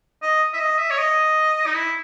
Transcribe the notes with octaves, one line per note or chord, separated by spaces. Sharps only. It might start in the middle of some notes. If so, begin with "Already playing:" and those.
D#5
E5
D#5
E5
C#5
D#5
D#4
E4